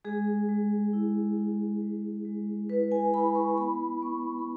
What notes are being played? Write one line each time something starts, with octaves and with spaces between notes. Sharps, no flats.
G#3 G#4
G#3
E4
E4
G#3
G#3
E4 B4
G#5
E4 B5
C#6
B3 B5
B3 C#6
B5